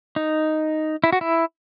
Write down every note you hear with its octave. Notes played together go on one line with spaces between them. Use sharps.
D#4
E4
F#4
E4